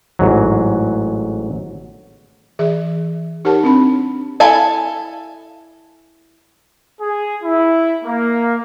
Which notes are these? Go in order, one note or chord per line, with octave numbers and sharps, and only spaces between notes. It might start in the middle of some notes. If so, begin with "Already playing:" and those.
A1 G#2 F#3
E3 G#4 E5
D#4 G4 A#4 C#5 F#5 A5
C4 D4 B5
E4 A4 F5 G#5 A5
G#4
E4
A#3